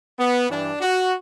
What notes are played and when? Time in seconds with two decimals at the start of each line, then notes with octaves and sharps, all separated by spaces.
0.20 B3
0.50 G2 E3 D4
0.81 F#4